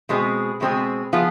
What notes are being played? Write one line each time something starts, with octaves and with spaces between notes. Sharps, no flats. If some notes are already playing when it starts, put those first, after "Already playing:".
B2 G#3 C4 G#4
B2 G#3 C4 G#4
F3 B3 F4 G#4